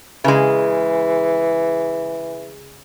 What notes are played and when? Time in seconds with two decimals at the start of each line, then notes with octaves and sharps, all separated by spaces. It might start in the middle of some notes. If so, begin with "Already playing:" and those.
0.24 C#3 E3 G#3